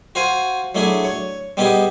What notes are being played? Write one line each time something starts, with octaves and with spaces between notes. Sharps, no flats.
F#4 C5 F5 G#5
F#3 A3 D4 E4 G#4
C#5
G3 B3 D#4 G4 G#4